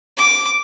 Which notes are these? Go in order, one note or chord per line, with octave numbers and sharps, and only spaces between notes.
D6